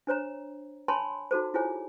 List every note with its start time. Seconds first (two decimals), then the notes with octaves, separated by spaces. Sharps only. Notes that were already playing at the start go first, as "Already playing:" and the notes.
0.07 D4 C5 C#5 A#5
0.88 C#5 G#5 A5 B5 C6
1.31 D#4 F#4 A4 C5
1.54 E4 F4 G#4 C5 C#5 G#5